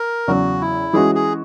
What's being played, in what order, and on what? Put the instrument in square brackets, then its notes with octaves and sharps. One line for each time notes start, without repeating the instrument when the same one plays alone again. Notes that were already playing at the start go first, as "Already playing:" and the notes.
Already playing: [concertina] A#4
[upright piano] E2 C#3 F#3 [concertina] F#4
[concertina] E4
[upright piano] E3 G#3 C#4 F#4 [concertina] G#4
[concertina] G#4